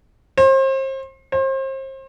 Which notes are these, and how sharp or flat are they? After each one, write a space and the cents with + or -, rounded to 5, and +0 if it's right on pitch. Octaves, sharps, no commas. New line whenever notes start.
C5 +35
C5 +35